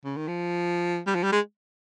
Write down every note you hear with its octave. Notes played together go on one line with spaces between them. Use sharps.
C#3
D#3
F3
G3
F3
G3
G#3